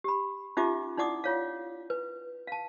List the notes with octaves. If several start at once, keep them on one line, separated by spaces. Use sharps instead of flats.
G4 B5
C#4 D#4 F4 G4 E5 D6
D#4 E4 D5 F#5 D6 D#6
F4 C#5 F5
B4
F5 A5